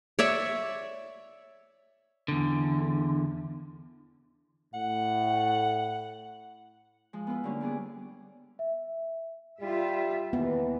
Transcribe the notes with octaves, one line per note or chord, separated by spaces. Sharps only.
C#5 D5 E5
E2 D3
A2 F#5
F3 G#3
B3 E4 F4 B4
D3 G3 A#3 C#4 D4
G3 B3 G#4 D6
E5
G3 F4 E5
D#2 E3 B3